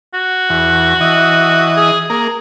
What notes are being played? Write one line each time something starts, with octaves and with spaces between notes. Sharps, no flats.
F#4
E2
E3 D#5
G#4
A#3 G#4